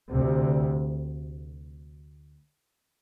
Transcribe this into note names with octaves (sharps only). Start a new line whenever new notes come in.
D2 C3